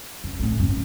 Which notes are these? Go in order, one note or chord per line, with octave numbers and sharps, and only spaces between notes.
F#2
A2 A3
F#2